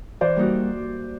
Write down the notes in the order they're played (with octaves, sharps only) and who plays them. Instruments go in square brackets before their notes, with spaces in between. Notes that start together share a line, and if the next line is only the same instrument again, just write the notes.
[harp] E3 [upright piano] C5 D5
[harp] G3 A#3 D#4 F#4